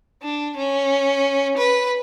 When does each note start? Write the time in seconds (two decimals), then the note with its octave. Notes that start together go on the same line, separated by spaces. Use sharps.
0.22 D4
0.57 C#4
1.58 B4